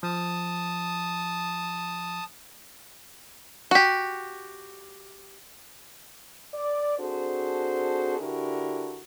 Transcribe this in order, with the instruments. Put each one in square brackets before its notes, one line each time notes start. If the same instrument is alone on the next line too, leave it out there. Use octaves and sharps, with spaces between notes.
[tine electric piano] F3 [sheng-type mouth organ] A5 D#6
[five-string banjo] F#4 G4
[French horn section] D5
C4 D4 F#4 G#4 A4 C5
D3 D4 E4 F#4 G4 A#4